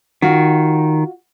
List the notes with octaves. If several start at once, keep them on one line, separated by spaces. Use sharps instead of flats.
D#3 F4 F#4